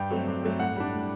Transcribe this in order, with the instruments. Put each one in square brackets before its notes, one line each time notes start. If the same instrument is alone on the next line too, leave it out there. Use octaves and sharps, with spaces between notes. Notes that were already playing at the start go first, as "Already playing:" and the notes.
Already playing: [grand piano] G2 G5
F#3 A3 C4
G2
F#3 A3 C4
A2 F#5
G3 D4
A2